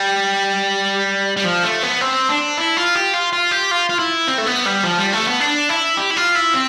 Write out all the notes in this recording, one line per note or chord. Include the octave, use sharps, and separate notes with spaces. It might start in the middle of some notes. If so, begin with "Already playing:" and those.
Already playing: G3
G3
F3
A3
B3
C4
D4
E4
F4
G4
F4
F4
G4
F4
F4
E4
C4
A3
B3
G3
F3
G3
A3
B3
D4
E4
G4
E4
F4
E4
C4